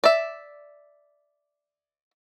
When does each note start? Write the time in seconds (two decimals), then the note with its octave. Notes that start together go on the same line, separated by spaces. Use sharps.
0.04 D5 E5